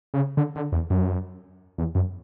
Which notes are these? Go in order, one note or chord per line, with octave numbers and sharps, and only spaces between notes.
C#3
D3
D3
E2
F#2
E2
F#2